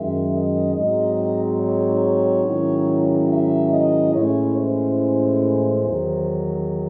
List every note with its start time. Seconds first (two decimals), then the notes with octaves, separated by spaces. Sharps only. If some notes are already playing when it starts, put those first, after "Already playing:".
Already playing: F#2 D#3 G#3 E5
0.32 D#5
0.74 G#2 F#3 C4 D#4 D#5
1.60 C#5
2.44 G#2 D#3 F#3 C#4 E4
3.29 E5
3.72 D#5
4.14 A2 E3 G#3 C#4 E4 C#5
4.56 C5
5.84 E2 D#3 F#3